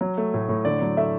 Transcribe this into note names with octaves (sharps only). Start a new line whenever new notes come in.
F#3
A3
A2
A2
D3 D5
F#3
A3 E5